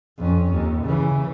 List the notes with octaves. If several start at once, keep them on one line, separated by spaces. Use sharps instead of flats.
F2 C#4
D#2
C#3 E3